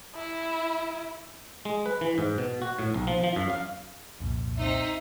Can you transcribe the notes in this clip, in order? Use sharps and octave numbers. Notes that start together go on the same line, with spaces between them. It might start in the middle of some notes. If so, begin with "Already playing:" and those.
E4
G#3
B4
E3
G#2
B2
F#4
A2
B1
F3
F3
F#2
F5
C2 F2 A#2
C4 D#4 E5